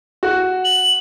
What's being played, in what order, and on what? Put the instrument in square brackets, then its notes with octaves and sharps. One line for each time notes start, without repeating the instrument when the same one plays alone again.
[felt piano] F#4
[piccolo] F#7